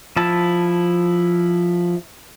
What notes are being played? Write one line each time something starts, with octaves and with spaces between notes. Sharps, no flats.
F3 E4 A5